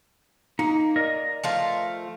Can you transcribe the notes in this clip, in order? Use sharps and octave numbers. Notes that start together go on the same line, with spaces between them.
A#3 D#4
A#4 D5 D#5
F3 A3 F5